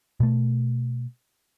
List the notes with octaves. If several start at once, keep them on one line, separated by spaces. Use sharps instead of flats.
B2 A3